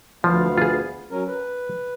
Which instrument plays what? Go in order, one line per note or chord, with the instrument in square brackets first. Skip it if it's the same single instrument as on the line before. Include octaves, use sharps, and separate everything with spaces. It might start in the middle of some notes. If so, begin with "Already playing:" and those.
[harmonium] D2 B3 F5 [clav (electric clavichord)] F3
[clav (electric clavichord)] F4 G#4
[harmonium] F#3 C#4 A#4
B4